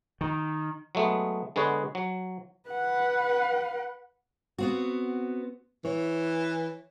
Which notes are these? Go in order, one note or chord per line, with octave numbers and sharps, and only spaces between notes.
D#3
F#3 G#3 A3 B3
D3 G#3 B3 B4 C#5
F#3
B4 F#5
B3 C4 F#4
E3 C#5